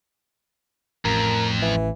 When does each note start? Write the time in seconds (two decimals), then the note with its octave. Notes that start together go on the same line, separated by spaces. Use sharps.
1.05 A1 F2 A#4
1.62 E3